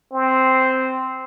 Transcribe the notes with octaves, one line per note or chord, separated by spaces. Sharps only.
C4